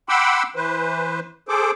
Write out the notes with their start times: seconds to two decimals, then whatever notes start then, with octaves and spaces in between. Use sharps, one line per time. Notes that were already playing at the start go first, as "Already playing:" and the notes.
0.09 F#5 G5 B5 C6 D6 E6
0.56 E3 B4 C5
1.49 G#4 A4 C5 D6